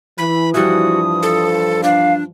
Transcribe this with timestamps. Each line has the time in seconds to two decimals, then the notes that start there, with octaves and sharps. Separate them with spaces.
0.18 E3 B5
0.54 G2 E3 F3 G3 F#4 D#6
1.23 A4
1.84 D4 F5